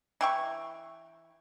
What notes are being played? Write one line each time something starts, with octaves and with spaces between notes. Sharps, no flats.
E3 G5 C#6